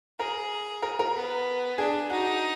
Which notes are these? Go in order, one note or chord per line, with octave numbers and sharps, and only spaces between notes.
G#4 A#4
A#4
A#4
B3
D4 G#4
D#4 F#4